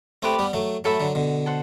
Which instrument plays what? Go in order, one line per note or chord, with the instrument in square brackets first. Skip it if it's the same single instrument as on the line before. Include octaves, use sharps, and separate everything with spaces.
[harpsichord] A3 C4 [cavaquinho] G4 B4 D5
[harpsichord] G3 B3
F#3 A3
[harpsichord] F#3 A3 [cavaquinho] A4 E5 B5
[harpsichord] D3 F#3
B2 D3
[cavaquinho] A4 C5 F#5